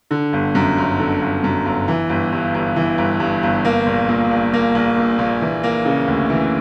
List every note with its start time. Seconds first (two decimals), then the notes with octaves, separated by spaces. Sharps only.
0.11 D3
0.33 G1
0.55 F#2
0.78 G1
1.00 D3
1.22 G1
1.44 F#2
1.66 G1
1.88 E3
2.09 G1
2.32 G2
2.54 G1
2.76 E3
2.98 G1
3.20 G2
3.43 G1
3.65 A#3
3.86 A#1
4.09 A#2
4.31 A#1
4.53 A#3
4.75 A#1
4.97 A#2
5.19 A#1
5.42 E3
5.63 A#3
5.85 C#3
6.07 D2
6.30 E3